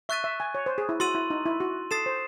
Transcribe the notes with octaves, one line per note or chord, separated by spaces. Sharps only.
E5 C#6 F#6 A6 D#7
E5
G#5
C#5
C5
G#4
E4
F#4 C6 E6 A6 D#7 F#7
E4
D#4
E4
F#4
A4 D#6 A6 C7 E7
C5